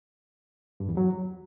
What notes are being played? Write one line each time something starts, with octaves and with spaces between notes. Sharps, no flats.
G2
E2
F#3